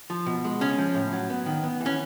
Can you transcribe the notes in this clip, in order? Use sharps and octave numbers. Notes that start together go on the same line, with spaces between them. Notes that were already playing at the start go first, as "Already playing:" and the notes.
F3
B2
G#3
C#3 C#4
F3
A2
F#3
B3
D#3
B3
E3
C#4